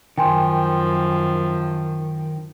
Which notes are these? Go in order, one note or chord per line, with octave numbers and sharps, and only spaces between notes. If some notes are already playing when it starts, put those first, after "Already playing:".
F#2 D#3 F3 G5 G#5 C6